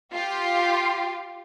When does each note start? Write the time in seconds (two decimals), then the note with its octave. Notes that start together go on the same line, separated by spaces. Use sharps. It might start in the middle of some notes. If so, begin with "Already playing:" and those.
0.13 F4 G4